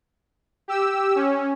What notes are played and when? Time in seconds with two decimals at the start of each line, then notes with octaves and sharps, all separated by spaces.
0.68 G4 E6
1.15 C#4